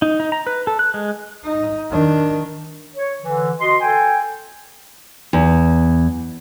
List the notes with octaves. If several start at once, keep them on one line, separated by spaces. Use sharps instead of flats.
D#4
D#4
A#5
B4
A4
F#6
G#3
D#4
D#3 D4
C#5
D3 E3
F#4 D#5 C6
A4 G5 G#5
E2